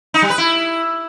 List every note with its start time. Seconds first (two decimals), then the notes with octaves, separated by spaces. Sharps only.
0.14 D#4
0.22 G3
0.30 B4
0.38 E4